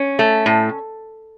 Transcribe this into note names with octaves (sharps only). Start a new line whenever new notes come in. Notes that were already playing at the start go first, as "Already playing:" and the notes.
Already playing: C#4
A3
A2